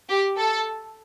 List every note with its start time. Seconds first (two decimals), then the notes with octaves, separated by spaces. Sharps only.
0.10 G4
0.38 A4